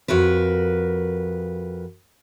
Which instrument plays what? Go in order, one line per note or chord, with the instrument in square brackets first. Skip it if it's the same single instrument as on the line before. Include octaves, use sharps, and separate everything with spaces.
[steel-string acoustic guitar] F2 F#4 A#4 B4